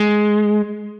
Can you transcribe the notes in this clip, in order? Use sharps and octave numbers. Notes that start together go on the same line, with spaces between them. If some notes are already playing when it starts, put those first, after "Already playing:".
Already playing: G#3